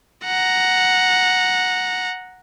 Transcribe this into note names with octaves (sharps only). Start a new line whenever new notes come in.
F#5 A#5